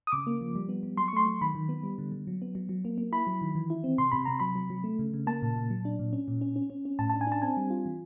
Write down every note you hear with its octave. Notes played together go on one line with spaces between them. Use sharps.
D#6
C#3 D6
A#3
F3
G3
B3
G3
F#3 C6
C#6
A3 C6
F#3
D#3 B5
D#3
B3
G3
D3
D3
F#3
B3
F#3
F#3
A#3
A#3
E4 B5
F#3
D#3
E3
E4
C4
C3 C6
C3 B5
C3 A#5
F#3 B5
F#3
F#3
A3
C#3
C#3
A#3 A5
A#2
A#2
F#3
D4
A#2
C#4
A#2
C#4
C#4
C#4
C#4
A2 A5
A5
D4
G#5
D4 A5
C4 G#5
G3
F4
E3